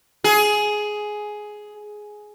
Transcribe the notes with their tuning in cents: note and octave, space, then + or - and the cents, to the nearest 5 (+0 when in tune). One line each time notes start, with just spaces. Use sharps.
G#4 +10